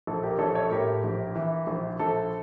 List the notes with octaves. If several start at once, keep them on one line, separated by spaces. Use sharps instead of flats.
A#1 A4
G4 A#4
A#1 A4 C#5
A4 C#5
A2 G4 A#4
A#1
E3
A#1
A#1 A4